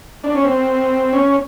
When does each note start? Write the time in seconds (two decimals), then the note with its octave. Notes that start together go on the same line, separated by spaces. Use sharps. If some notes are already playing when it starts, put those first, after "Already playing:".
0.24 D4
0.35 C#4
0.45 C4
1.13 C#4